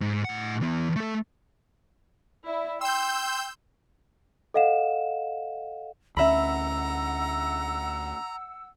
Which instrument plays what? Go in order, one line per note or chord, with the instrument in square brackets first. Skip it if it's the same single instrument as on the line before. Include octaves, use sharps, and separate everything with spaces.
[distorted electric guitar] G#2
A2 F#5
E3 B3
A3 A4
[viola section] E4 [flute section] D5 E5
[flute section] G5 [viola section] C6 [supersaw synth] E6 G6
[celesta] A4 D#5 F5 F#5 E7
[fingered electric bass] D2 C#4 [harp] E5 B5 [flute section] F#5 E6 [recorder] A#5